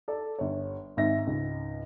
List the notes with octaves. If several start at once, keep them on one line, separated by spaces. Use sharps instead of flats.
A4 D5 A5
G1 C#5
G#1 G#2 E5 A#6
C#2 G#2